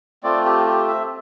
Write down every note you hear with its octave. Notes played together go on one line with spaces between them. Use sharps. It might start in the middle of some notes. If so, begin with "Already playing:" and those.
A3 C4 F4 D5
G4
G4
E5